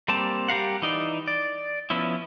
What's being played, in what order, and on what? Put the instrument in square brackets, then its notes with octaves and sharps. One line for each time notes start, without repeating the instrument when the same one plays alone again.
[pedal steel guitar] G3 A#3 C4 G4 A5
G3 G4 A#4 F5 F#5
E3 D#4 D5
D5
F3 B3 C#4 E4